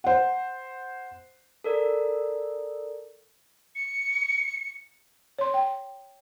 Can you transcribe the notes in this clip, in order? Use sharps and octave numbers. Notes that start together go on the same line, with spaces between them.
C5 F#5
A4 A#4 D5
C#7
C#5 C6
G5